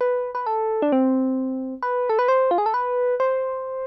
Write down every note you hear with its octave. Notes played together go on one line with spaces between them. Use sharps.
B4
B4
A4
D4
C4
B4
A4
B4
C5
F4
G#4
A4
B4
C5